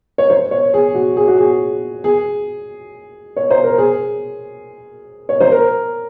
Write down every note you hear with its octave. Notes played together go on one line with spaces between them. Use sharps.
C#5
C5
C#5
G#4
F#4
G#4
F#4
G#4
G#4
C#5
C5
A#4
G#4
C#5
C5
A#4